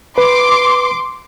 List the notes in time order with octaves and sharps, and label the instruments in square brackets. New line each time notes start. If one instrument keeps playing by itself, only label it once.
[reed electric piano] B4 [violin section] C6 D6